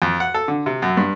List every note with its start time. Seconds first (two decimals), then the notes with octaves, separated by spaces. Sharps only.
0.02 F2
0.20 F#5
0.34 A4
0.48 D3
0.66 C3
0.82 F#2
0.97 G2